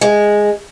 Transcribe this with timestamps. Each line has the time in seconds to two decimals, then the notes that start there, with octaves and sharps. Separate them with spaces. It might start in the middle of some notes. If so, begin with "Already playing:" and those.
0.01 G#3